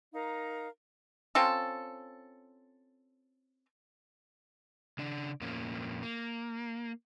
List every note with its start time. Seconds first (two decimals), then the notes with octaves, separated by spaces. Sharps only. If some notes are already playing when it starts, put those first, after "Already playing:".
0.13 D#4 A#4 F5 A#5
1.35 C4 C#4 F4 A4
4.98 C#3 D4 D5
5.41 F2 A#2 A#3 C#4
6.03 A#3